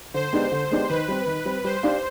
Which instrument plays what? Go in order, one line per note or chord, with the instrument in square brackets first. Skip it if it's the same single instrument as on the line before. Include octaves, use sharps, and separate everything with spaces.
[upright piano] D3 [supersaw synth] C5
[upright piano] G#3 B3 D4 G4
D3
G#3 B3 D4 G4
[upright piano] D#3 [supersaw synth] B4
[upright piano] G3 C4
D#3
G3 C4
[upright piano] G3 [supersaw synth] C5
[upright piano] D4 G4 D5 F5